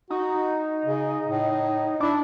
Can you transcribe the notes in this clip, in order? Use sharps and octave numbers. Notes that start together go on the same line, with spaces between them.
D#4 F#4
C#3
A2
D4 E4